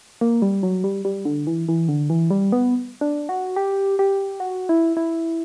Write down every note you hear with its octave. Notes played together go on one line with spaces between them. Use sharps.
A#3
G3
F#3
G3
G3
D3
E3
E3
D3
E3
G3
B3
D4
F#4
G4
G4
F#4
E4
E4